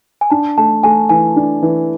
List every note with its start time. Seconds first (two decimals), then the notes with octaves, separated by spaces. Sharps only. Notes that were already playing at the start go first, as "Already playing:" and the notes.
0.21 G#5
0.30 D4 A5
0.58 A3 A5
0.84 A3 G#5
1.09 E3 G#5
1.36 D4
1.63 E3